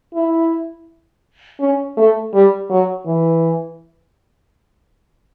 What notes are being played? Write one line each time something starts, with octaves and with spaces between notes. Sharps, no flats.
E4
C#4
A3
G3
F#3
E3